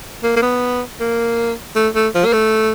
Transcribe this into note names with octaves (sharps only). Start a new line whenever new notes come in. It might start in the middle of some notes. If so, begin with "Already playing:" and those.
A#3
A#3
B3
A#3
A3
A3
F3
A#3
A3